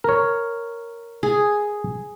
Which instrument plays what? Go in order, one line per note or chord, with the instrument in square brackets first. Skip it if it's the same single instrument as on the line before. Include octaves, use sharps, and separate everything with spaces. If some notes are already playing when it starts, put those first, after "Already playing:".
[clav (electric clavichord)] A#4 C#5
[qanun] G#4